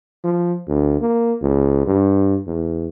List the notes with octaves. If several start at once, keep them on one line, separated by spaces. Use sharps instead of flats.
F3
D2
A#3
C#2
G2
E2